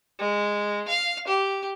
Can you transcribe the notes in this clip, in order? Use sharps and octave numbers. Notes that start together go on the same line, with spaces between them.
G#3
F5
G4